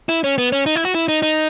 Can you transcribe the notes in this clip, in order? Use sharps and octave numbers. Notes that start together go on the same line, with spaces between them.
E4
C#4
B3
C#4
D#4
E4
F#4
E4
D#4
D#4